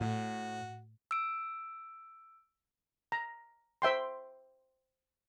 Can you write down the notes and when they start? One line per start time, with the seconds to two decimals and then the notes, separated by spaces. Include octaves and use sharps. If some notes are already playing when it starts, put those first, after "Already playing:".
0.01 A2 F#4
1.11 E6 D7
3.12 A#5
3.82 C5 E5 G5 C6